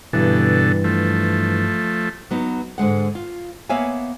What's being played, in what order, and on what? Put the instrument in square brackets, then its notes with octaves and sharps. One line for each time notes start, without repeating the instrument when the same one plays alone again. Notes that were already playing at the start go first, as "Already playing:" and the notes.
[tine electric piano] G2 E3 [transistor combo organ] B2 D3 A4
[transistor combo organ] F3 A3
[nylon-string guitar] F#3 B3 D#4
G#2 D3 G#3 F#5
F4
A#3 B3 C#5 E5 F5 G#5